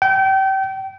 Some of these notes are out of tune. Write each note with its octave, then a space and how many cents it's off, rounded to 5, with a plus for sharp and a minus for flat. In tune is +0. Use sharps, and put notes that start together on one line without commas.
G5 -30